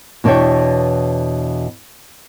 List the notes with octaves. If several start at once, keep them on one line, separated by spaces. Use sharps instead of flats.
E2 B2 D4 B4 C#5 G5